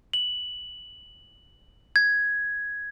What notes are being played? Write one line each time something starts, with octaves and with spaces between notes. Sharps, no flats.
F#7
G#6